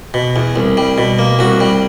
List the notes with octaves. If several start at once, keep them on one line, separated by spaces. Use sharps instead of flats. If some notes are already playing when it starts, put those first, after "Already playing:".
B2
E2
C2
G3
B2
A#3
C2 F#4
G3